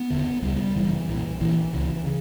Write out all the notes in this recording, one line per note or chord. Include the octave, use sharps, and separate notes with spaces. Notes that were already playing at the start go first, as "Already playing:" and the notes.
Already playing: B3
F#1 E2 D3
C#2 C#3 G3
G1 F#2 C#3 E3
B1 A#2
A#1 A#2 E3
C#2 C#3
C#3